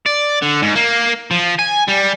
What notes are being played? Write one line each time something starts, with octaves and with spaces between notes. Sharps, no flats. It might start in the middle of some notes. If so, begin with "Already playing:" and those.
D5
D3
G#2
A#3
F3
G#5
G3